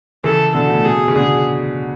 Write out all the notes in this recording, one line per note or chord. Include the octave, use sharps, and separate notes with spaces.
C#3 E3 A4
B2 D3 A4
A2
B2 G#4
C#3
B2 D3 G#4